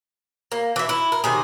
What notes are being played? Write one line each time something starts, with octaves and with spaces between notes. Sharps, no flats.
A#3
E3 E5
E4
A#4
C3 D#3 G#4